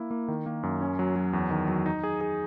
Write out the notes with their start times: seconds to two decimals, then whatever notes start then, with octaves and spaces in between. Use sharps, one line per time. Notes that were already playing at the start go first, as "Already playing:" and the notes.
Already playing: A#3 E4
0.11 A#3
0.28 D#3
0.46 A#3
0.63 F#2
0.81 C#4
0.99 F#3
1.16 F#3
1.33 E2
1.50 D#3
1.68 F#3
1.86 D#4
2.04 G#4
2.21 G#4